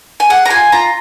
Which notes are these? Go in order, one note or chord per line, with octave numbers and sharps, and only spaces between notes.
G#5
G#4 F#5
A#5
F4 G#5
F4 A#5